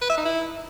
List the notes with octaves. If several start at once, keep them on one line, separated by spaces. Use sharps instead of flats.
B4
E5
D#4
E4